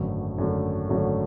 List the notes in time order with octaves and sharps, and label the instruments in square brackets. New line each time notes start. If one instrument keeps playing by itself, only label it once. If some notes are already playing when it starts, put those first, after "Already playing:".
Already playing: [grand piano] G#1 F#2 D3 F#3 A3
G#1 F#2 D3 F#3 A3
G#1 F#2 D3 F#3 A3